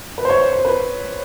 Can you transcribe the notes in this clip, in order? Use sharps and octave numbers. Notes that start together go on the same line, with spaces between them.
B4
C5
C#5
C#5
C5
B4